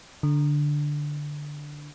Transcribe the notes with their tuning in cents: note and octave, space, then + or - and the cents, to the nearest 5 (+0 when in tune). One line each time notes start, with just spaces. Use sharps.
D3 +0